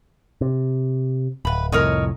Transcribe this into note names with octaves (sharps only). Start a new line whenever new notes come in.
C3
D1 B4 B5
C2 F2 A2 A#4 C#5 D#5